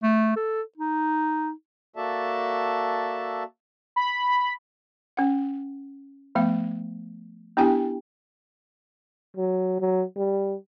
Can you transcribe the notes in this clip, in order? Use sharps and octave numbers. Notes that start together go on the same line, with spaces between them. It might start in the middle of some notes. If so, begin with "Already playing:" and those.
A3
A4
D#4
A#3 F#4 A4 D5 E5 A5
B5
C#4 F#5
F3 A3 B3 F5
B3 D4 E4 G4 G5 G#5
F#3
F#3
G3